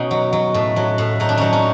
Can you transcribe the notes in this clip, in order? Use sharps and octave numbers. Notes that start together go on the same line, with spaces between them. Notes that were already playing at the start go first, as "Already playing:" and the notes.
Already playing: B2 C#4 D#4
F#3
F#3
A2
F#3
A2
F#3 D#4
D4
F#3 C#4 D#4
C#4 D#4